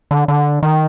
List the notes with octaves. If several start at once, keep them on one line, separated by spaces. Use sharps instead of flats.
D3
D3
D#3